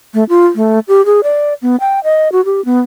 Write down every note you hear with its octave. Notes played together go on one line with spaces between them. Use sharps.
A3
F4
A3
G4
G#4
D5
B3
G5
D#5
F#4
G4
B3